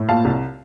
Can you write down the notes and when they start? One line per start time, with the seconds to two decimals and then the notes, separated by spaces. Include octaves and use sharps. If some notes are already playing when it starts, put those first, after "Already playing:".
Already playing: A2
0.09 A#2 F5 A5
0.25 C2